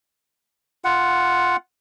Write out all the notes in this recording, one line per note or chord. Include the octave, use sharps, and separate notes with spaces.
F4 F#5